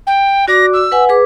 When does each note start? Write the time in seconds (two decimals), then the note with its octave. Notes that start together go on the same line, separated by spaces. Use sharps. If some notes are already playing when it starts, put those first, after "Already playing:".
0.06 G5
0.48 F#4 D5 D6 A#6
0.73 E6
0.92 B4 F#5 G#5
1.09 G#4 B4 D6